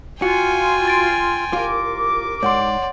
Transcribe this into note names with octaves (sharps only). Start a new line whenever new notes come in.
F4 F#4 G5 G#5 C#7
C6 A6 D7
C2 F4 A#4 D6
G#2 C#5 D5 F#5 C6